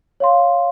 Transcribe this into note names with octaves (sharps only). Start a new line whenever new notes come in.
C#5 F5 C6